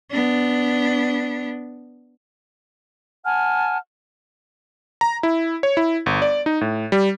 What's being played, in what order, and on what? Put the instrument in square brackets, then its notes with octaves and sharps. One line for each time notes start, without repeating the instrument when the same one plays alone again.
[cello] B3 D4
[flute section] F#5 G#5 A5 F6
[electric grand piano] A#5
E4
C#5
E4
G1
D5
D#4
A2
G3